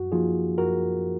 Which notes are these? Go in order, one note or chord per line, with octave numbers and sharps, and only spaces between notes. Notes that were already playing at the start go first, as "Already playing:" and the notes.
Already playing: F#2 F#4
F3 A#3 D#4 F4 G#4
F#2 F#4 A#4